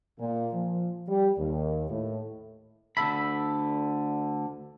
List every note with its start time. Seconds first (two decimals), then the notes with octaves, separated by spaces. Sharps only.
0.19 A#2
0.53 F3
1.08 G3
1.38 D#2
1.89 A2
2.97 D2 D3 A4 E5 B5